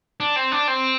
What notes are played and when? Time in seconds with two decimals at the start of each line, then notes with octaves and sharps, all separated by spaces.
0.20 D4
0.36 C4
0.52 D4
0.68 C4